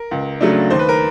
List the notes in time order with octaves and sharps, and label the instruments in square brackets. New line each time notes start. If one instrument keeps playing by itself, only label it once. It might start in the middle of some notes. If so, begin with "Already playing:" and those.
Already playing: [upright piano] A#4
C#2
C#3 F#3 A3 D4
D#2 C5
B4
A#4